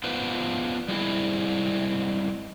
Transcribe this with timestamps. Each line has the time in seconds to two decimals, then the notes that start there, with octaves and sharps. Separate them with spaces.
0.04 B3 D4 F4 B4 C5
0.88 G3 G#3 C4 E4